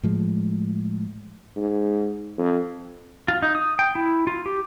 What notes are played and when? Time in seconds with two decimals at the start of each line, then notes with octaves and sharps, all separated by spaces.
0.03 A2 F3 G#3
1.56 G#2
2.38 F2
3.28 F4
3.42 D#4
3.55 D#6
3.79 G5
3.95 E4
4.27 F4
4.46 G4